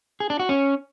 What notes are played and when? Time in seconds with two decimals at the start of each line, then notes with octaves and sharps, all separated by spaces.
0.20 G#4
0.30 D4
0.40 F#4
0.49 C#4